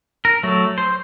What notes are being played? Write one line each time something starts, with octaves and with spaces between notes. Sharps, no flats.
A#4
F#3 A3
C5